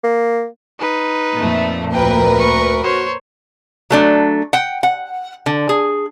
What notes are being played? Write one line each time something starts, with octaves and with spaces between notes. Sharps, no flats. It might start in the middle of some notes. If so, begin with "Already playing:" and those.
A#3
D#4 B4
F2 A#2 A3
D2 A#4 B4 G5
C#6
F#4 C5 C#5
F#3 A3 D4
F#5 G5
F#5
D3
G#4